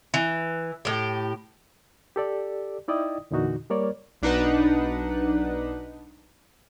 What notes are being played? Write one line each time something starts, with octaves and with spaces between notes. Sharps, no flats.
E3
A2 G4
G4 A4 D5
D#4 E4 D5 D#5 G5 D#6
E2 A#2 D3 E3 D#4 F#4
G3 A#3 A#4 C#5 D5
B1 D4 D#4 B4 F#5